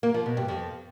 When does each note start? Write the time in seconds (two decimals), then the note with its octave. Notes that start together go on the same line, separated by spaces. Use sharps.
0.03 A#3
0.14 F3
0.26 B2
0.37 G2
0.48 F2